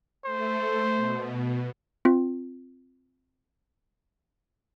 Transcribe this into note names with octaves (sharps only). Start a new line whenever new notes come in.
A3 C5
B2
C4 F4